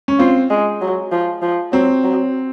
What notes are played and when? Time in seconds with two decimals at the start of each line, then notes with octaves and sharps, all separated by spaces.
0.08 C#4
0.19 C4 F4
0.50 G#3
0.81 F#3
1.12 F3
1.42 F3
1.72 F#3 C4
2.03 F#3